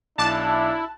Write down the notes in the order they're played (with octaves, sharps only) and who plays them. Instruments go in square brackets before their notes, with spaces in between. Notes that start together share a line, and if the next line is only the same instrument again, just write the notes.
[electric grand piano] B1 D6 F#6 [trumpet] D4 [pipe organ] E4 [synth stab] A5